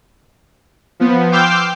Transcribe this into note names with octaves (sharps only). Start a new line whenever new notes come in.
F3 B3
G5 C6 D6 E6 F6 G6